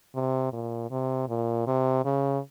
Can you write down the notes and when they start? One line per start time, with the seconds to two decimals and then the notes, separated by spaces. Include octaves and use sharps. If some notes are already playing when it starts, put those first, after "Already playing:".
0.15 C3
0.53 A#2
0.91 C3
1.28 A#2
1.67 C3
2.05 C#3